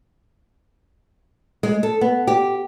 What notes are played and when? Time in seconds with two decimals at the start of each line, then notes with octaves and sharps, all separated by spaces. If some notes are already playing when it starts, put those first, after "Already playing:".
1.63 G#3
1.83 A4
2.01 B3
2.27 G4